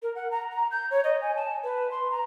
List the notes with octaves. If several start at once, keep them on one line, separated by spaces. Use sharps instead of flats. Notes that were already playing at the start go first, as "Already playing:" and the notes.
A#4
F#5
A#5
A#5
G6
C#5
D#5
G#5
A5
B4
C6
A#5